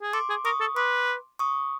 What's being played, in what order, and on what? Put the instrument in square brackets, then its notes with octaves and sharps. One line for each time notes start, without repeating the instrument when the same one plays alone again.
[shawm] G#4
[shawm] A4 [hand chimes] C6 D6
[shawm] G#4
[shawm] A#4 [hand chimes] C#6 D#6
[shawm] A4
[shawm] B4 [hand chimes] C6 D6
[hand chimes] C#6 D#6